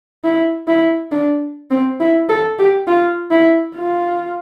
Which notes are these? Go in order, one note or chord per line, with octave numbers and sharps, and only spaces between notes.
E4
E4
D4
C4
E4
A4
G4
F4
E4
F4